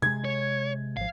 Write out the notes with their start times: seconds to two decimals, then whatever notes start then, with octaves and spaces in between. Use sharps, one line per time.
0.02 C3 G#3 G#6
0.25 C#5
0.97 G#1 F3 F5